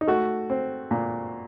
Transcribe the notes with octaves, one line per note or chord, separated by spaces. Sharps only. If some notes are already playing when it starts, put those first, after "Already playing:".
D#4
A3 F#4
C4
A#2